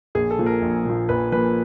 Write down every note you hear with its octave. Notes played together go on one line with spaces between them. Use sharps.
A#1 G#4
A4
A#2 F3
A#4
A#1
A#2 F3
A#1 B4
A#2 F3 B4